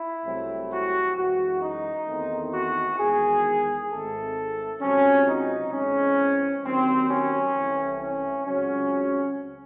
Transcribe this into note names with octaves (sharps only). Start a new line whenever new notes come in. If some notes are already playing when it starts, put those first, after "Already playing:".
Already playing: E4
C2 C3 F#3 A3 C4
F#4
F#2 E3 G#3 F#4
D#4
E2 D#3 A3 C4
F#4
E2 D#3 G#3 G#4
G#1 G#2 D#3 A3 C4 A4
C#2 C3 F#3 C4 C#4
D#4
E2 C#3 G#3 C4 C#4
D#2 D#3 F#3 C4
C#4
C2 C3 E3 A3 C4
C#4
C#2 C#3 F#3 C4 C#4